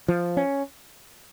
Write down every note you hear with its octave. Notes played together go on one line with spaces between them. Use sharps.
F3
C#4